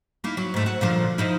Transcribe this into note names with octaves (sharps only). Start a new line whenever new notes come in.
A#3 D#4 E4
F#3
G#2 A3
F#4
A#2 D3 F3
F3 D#4 E4